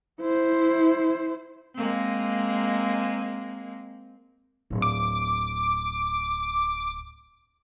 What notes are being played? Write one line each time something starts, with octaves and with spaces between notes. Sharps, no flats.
E4 C5
G#3 A#3 C4
D1
D6